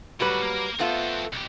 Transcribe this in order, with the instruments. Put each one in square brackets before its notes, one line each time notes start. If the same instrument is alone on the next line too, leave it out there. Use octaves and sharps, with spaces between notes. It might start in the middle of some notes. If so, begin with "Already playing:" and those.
[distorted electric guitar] A2 F#4 [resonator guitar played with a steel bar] F#3 G3 B4
[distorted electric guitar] A#3 A#4
[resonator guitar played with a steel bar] A3 B3 F4 [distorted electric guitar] C4 A4
[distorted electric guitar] B1 G4